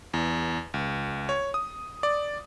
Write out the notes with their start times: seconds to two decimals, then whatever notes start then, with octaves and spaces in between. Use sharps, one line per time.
0.14 E2
0.74 C#2
1.29 C#5
1.54 D#6
2.03 D5